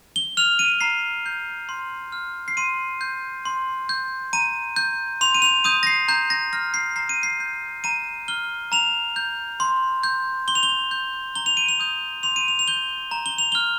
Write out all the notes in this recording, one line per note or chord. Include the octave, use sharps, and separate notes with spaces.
G7
F6 F7
D#7
A#5 C7
G6
C6
F6
C7
C6 D#7
G6
C6
G6
A#5 D#7
G6
C6 F7
D#7
F7
D#6 G6 D#7
A#6
C7
A#5 G6
A#6
F6 A#6
C7
A#5 C7
D#7
C7
G6
A#5 D#7
F6 G7
A#5 F7
G6
C6
G6
C6 G7
F7
G7
G6
A#5 G7
F7
D#7
F7
D#6 G6
C6 F7
D#7
F7
F7
G6 G7
A#5
G7
F7
F6 G7